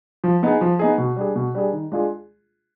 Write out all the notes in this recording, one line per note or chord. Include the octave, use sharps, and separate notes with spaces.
F3
B3 D#4 G#4
F3
B3 D#4 G#4
B2
G3 D4 G#4
B2
G3 D4 G#4
D#3
G#3 D4 F4 G#4